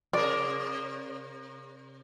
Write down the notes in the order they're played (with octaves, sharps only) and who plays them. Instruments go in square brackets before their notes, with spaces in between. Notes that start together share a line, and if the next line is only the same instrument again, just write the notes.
[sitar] C3 A#4 [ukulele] D5